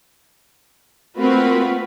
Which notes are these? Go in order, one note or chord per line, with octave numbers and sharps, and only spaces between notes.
A3 A#3 C4 F4 F#4 B4